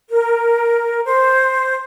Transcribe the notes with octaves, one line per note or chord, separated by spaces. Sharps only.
A#4
C5